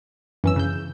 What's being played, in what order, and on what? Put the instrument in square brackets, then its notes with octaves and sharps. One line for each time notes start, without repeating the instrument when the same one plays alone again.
[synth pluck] F#2 [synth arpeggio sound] E3 C#4 E6
[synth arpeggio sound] C#3 G6